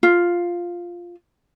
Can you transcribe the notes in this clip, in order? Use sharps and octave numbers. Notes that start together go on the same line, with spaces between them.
F4